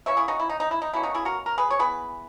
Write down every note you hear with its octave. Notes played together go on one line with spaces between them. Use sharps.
E3 A#3 C#4 C#5 E5
E4 G#4
D#4 F#4
E4
D#4
D#4
E4
D#4
B2 A#3 C#4 E4
D#4 F#4
E4 G#4
F#4 A#4
A#4
G#4 B4
C#5
E3 B3 G#4 B4